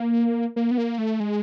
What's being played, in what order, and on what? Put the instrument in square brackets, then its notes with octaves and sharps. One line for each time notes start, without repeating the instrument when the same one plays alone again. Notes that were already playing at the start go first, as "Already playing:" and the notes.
Already playing: [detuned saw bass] A#3
A#3
B3
A#3
A3
G#3